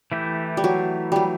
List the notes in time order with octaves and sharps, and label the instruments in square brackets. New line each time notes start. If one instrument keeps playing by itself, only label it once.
[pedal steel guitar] E3 A3 E4 G4
[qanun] G3
F#3
F#3 G3